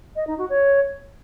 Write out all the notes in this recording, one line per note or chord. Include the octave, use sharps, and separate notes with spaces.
D#5
D#4
F#4
C#5